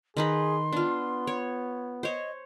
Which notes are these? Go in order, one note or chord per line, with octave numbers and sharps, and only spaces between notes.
D#3 D#4 G#4 B4 C6
B3 D4 F4
C#5
C5 C#5 D#5